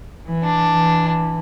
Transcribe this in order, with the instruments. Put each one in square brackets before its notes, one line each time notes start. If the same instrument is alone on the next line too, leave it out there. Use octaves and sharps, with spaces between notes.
[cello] E3
[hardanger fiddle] D4
[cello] E3